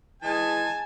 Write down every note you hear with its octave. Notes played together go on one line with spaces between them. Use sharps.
E3 G#3 G#5 A5